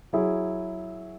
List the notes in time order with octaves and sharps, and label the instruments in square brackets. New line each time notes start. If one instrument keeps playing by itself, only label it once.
[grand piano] F#3 E4 G#4